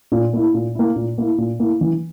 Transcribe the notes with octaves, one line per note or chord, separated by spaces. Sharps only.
A#2
A#3 E4
A#2
A#3 E4
A#2
A#3 E4
A#2
A#3 E4
E3